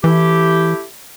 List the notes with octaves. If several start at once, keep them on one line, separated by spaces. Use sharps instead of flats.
E3 A3 E4 G4